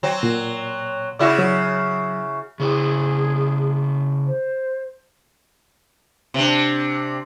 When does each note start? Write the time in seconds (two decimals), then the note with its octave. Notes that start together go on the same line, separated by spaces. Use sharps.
0.03 F#3 C4
0.23 A#2
1.19 C#3 E4 F#4 D5
1.39 F#3
2.60 C#3 E4 G#4
4.27 C5
6.34 C3 D4